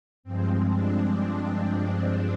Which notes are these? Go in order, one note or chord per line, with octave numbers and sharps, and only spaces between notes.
G2 F3 G#3 C4
D4